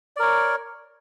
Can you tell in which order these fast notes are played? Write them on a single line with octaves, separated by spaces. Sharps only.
D5 A#4 C#5